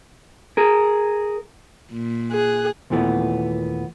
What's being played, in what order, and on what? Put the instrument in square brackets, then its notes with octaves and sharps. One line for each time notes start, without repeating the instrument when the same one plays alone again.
[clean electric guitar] G#4 A#4
[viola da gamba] A#2
[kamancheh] G#4 F#6
[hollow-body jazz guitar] D#2 A#2 E3 A3 B3